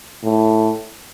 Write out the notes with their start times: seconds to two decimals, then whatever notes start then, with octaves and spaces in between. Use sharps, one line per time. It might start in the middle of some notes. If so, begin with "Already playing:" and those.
0.24 A2